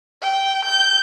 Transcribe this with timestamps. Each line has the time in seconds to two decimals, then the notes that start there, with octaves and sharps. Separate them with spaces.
0.22 G5
0.65 G6